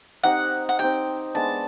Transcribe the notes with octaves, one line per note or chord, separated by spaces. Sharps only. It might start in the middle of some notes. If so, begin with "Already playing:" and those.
C4 D#4 G4 F#5
F#5
C4 D#4 G4 G5
G#3 B3 D4 A5